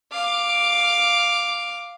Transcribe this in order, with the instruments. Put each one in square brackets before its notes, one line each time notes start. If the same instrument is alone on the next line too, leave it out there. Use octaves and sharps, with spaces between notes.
[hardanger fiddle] F5 D6